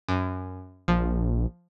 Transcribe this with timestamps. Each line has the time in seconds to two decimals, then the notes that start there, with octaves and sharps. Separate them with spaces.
0.08 F#2
0.88 A#1 F3